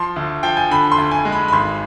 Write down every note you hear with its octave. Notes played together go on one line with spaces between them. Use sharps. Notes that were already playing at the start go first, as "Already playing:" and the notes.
Already playing: F3 C6
D2
F3 G5
G#5
D3 B5
C6
D2
G#5
G#3
B5
B5
G#1 C6